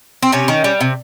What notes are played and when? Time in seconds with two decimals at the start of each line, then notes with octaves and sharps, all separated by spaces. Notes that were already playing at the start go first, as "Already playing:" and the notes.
0.22 C4
0.32 C3 C#4
0.48 D#3
0.64 G3
0.81 C3